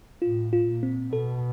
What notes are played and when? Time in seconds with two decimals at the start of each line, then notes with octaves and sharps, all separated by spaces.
0.22 A2 F4
0.53 F4
0.67 A#2
0.83 C4
1.12 B2 A4